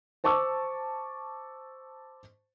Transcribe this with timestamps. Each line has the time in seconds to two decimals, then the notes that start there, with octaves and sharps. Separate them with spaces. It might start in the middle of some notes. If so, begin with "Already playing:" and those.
0.24 C5 A5 C#6 D6 E6